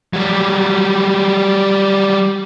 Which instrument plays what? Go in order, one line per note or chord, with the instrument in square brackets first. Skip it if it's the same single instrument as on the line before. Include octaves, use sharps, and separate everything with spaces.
[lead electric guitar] F#3 G3